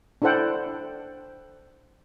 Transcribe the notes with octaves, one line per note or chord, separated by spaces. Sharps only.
D4 E4 A4 C5 F#5 G5